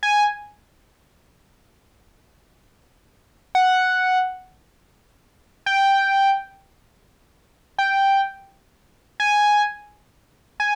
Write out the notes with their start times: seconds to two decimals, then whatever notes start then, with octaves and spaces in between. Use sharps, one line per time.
0.03 G#5
3.55 F#5
5.66 G5
7.78 G5
9.20 G#5
10.60 G#5